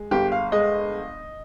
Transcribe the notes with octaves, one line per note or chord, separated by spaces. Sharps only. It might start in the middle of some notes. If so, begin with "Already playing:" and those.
Already playing: G#3
G1 G4
F5
G#3 D#5